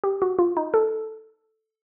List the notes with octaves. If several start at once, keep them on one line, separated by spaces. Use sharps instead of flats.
G4
F#4
F4
D#4
A4